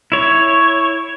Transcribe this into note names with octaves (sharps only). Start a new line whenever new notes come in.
E4 C#5